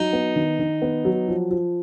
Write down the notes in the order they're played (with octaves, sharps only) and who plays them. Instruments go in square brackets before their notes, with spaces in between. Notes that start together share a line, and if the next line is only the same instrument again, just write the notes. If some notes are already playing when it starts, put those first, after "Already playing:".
Already playing: [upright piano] F#3 [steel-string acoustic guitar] D#4
[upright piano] B3
D#3
D#3
B3
F#3
F3
F3